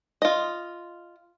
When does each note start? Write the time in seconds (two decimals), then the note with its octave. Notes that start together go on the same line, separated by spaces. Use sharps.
0.22 F4 D#5